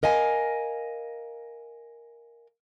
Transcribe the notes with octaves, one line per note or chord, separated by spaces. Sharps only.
A#4 D#5 F5 G#5